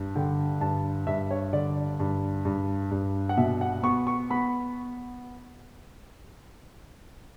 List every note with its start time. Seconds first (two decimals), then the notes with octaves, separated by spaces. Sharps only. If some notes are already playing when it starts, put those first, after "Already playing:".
Already playing: G2
0.16 D3 G5
0.61 G2 A5
1.07 G2 E5
1.31 C#5
1.53 D3 D5
2.00 G2
2.45 G2
2.91 G2
3.29 F#5
3.37 B2 E5
3.61 F#5
3.83 B3 C#6
4.07 C#6
4.30 B3 B5